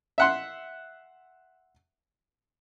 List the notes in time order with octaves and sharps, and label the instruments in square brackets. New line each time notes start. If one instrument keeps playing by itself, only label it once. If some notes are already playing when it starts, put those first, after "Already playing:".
[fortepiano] E5 F#5 C6